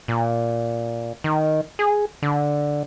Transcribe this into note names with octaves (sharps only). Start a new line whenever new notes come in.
A#2
D#3
G#4
D3